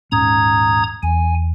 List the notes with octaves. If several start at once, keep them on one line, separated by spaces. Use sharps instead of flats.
D#1 G#2 C#4 A#5 D#6 G#6
E2 G#5